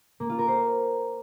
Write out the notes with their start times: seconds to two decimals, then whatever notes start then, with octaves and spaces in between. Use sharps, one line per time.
0.20 A#3
0.29 F4
0.39 A#4
0.48 C5